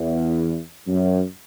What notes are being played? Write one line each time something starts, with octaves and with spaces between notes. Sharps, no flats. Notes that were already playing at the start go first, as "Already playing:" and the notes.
Already playing: E2
F#2